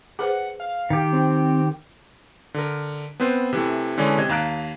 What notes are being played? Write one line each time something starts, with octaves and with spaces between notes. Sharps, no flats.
G#4 B4 C5 F#5
F5
D#3 G4
C4
D3 A#4
B3 C4 B4 C5
C3 E3 A3
D3 E3 G#3 C#4 D4
C3 D#5 G#6
D#2 F5 A#5 F#6 D7